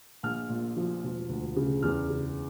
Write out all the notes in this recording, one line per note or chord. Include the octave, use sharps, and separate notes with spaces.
A#1 F6
A#2
F3
E1
D2
C#3
E2 F6
C#3